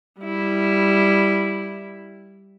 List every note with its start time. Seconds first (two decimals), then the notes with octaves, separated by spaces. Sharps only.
0.21 G3 E4